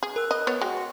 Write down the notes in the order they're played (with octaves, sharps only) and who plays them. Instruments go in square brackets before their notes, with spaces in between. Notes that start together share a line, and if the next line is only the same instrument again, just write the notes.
[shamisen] G#4
[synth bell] A#4 E6 [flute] F#6
[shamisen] D#5 [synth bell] B5
[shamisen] B3 C#5
[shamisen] G#3 [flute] F#4 [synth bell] G5
[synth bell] C6